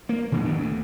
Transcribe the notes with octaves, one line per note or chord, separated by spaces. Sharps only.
A#3
A#2 D3 F#3 G#3
D2 D#3 B3 D4
D2